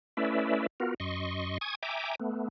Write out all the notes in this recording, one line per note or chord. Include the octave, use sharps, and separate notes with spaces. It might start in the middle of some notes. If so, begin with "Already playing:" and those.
A3 C#4 E4 B4 D5 E5
B3 F4 F#4 A#4
F#2 D#5 C6 C#6
G#5 C#6 D#6 G#6
E5 G5 G#5 A#5 D6
A3 B3